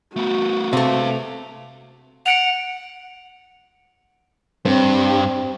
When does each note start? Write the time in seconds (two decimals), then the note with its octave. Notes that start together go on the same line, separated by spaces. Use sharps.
0.16 A3 B3 F#4
0.73 C3 A3 B4 F5
2.26 F#5 C#7 D7 F7
4.65 G2 C4